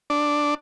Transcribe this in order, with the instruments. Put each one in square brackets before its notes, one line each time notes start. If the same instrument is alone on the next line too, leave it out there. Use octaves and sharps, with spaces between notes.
[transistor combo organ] D4